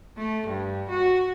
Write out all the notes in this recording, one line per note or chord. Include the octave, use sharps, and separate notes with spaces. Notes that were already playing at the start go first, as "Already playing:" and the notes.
A3
G2
F#4